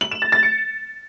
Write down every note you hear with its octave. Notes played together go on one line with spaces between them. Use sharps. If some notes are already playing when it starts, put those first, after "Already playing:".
F#7
E7
A6
A6
C#7